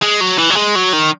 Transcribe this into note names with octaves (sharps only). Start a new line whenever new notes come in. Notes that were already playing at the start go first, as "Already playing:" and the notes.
G#3
F#3
E3
F#3
G#3
F#3
D#3